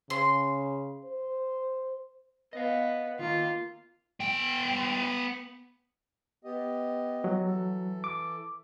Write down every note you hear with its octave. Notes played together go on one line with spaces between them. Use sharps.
C#3 C6
C5
B3 D#5 F5
D#3 A#3 F4
B3 G5
B3 G4 D#5
F#3
E3 A4
D6